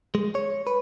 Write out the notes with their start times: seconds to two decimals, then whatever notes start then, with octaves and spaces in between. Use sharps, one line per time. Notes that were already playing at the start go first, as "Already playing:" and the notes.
0.15 G#3
0.35 C#5
0.67 B4